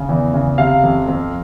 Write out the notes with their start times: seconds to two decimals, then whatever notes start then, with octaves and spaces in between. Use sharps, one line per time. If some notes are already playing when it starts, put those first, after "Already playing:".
Already playing: C#3
0.09 E2
0.34 C#3
0.58 C3 F5
0.83 F2
1.08 F2